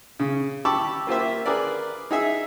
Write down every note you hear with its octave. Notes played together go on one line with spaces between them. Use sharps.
C#3
G4 A5 B5 C#6 D6 E6
A#3 F4 G4 C5 E5
G#4 A#4 B4 D5
D#4 G#4 E5